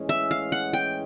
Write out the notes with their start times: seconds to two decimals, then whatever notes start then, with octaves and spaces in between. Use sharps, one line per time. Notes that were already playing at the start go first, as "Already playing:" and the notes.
Already playing: A2 E3 G#3 C#4
0.09 E5
0.31 F5
0.52 F#5
0.73 G5